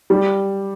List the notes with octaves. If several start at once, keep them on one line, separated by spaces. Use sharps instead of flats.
G3